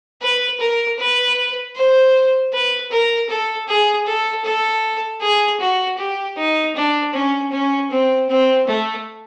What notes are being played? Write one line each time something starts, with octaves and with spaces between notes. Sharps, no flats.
B4
A#4
B4
C5
B4
A#4
A4
G#4
A4
A4
G#4
F#4
G4
D#4
D4
C#4
C#4
C4
C4
A3